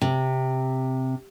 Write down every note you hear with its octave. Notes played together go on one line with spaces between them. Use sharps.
C3